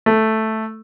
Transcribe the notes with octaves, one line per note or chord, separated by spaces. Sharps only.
A3